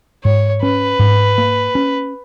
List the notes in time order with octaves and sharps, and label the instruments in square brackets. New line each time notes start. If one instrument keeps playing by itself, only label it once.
[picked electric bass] G#2 [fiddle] C#5
[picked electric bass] C#4 [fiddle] B4
[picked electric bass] G#2
A#3
C#4